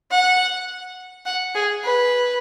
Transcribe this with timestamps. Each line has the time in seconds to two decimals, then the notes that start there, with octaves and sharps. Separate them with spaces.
0.11 F#5
1.26 F#5
1.55 G#4
1.83 B4